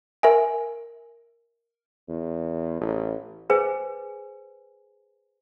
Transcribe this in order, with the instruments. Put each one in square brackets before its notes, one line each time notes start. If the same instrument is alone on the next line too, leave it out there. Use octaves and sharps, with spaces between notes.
[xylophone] A#4 E5 G#5
[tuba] E2
A1
[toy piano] G#4 B4 C5 G#5